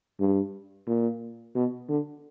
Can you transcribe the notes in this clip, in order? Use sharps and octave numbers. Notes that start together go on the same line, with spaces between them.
G2
A#2
B2
D3